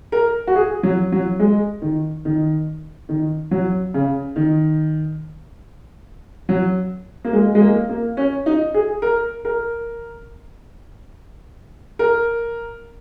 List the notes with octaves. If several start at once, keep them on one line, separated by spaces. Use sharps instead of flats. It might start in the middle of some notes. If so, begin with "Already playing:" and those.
A#4
F#4
G#4
F#3
F#3
G#3
D#3
D#3
D#3
F#3
C#3
D#3
F#3
A#3
G#3
G#3
A#3
A#3
C#4
D#4
G#4
A#4
A#4
A#4